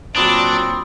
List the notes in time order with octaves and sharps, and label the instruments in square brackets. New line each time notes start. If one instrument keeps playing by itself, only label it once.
[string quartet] A#2 F#3 D6 [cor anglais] C4 [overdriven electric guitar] D4 [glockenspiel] B5 D#6 A6